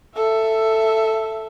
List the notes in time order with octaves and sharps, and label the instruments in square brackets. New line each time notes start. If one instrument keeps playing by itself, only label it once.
[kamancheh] A4 E5